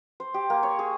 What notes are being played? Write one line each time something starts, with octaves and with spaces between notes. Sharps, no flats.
C5
G4
A#3
C#5
G#4